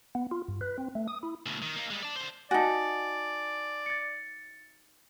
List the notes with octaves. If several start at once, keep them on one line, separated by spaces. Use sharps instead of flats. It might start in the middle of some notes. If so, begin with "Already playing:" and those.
B3
F4
G2
B4
C4
A3
D#6
E4
D2 B2
D#3
A#3 D#4
G3 G#3
D5 A5
D3 C5
D#4 F#4 D5 G#5 A5
A6 C#7